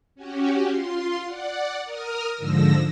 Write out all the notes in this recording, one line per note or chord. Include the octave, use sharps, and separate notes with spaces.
C#4 F#4 G4
F4 C6
D5 F#5
A#4 D#6 F6
G#2 D3 F3 E6 A#6